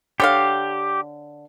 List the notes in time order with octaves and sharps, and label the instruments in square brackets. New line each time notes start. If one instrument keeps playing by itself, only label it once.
[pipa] D3 C#5 F5 [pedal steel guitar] G4